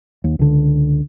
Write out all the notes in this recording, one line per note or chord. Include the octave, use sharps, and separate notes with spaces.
D#2
C#2 D3